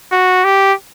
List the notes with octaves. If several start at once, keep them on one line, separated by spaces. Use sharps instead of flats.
F#4
G4